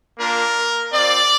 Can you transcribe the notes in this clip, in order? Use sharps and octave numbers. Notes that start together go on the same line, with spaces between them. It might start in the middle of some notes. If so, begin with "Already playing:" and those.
A#3 D4 F4 A#4
C4 F4 D5